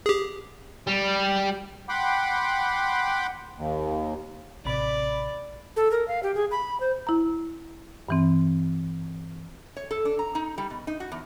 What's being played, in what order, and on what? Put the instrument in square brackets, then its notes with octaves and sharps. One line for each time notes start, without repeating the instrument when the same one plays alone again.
[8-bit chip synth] G4 G#4
[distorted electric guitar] G3
[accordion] F#5 G5 B5 C6 D6
D#2
[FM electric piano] A1 C3 B5 [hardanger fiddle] D5
[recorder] A4
A#4
F5
G4
G#4
B5
C5
[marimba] E4 A#5
G2 E3 C4
[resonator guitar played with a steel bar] C#5
A4
D4
A#5
D#4
G3
B2
D#4
F#4
E2